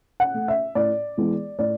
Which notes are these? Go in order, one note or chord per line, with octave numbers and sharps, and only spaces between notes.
F#5
A3
E5
A2 D5
E3 G#3 B3
A2 D5